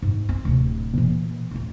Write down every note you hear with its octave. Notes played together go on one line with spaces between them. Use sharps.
G#2
C4
D1 C3
A#2 E3
D1 E4